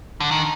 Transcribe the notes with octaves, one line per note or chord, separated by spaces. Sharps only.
D3
D#3